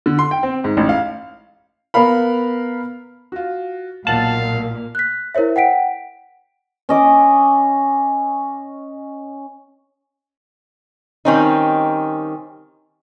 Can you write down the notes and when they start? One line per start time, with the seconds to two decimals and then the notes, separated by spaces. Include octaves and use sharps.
0.06 D3
0.19 C6
0.31 G5
0.43 C4
0.64 G#2
0.77 A1
0.89 F5
1.94 B3 A#4 F5 B5
3.32 F4 F#4
4.07 B1 A#2 F5 F#5 A5 F#7
4.95 F#6 B6
5.35 E4 A#4 C5 C#5 E5
5.56 F#5 G5 B6 D7
6.89 C#4 D#5 D6
11.25 D#3 G3 C4 C#4 D#4